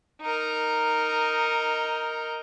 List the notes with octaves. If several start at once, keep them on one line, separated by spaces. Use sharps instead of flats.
D#4 A#4